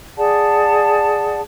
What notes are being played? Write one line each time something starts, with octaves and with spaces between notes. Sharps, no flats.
G#4 D5 F#5 A5